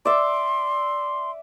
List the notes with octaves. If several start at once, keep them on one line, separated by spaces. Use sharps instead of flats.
D5 E5 C6